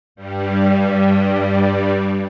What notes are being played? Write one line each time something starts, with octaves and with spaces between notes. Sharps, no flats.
G2 G3